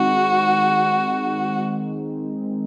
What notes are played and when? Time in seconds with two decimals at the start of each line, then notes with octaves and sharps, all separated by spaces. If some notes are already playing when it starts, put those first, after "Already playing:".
Already playing: D#3 G#3 C4 D#4 F#4